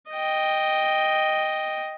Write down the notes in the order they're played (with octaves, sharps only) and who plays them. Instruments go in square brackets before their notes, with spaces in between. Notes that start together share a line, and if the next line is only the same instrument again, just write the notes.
[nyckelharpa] D#5 G5